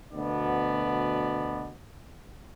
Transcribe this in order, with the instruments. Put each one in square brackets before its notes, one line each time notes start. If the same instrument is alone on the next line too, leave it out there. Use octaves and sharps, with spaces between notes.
[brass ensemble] D2 B2 B3 D5